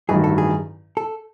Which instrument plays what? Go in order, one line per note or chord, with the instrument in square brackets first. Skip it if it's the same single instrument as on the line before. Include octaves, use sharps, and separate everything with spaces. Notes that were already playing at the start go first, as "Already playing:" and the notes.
[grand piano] A1 G2 D#3 F#3 [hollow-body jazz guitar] G#4
[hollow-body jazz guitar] A4
G#4
A4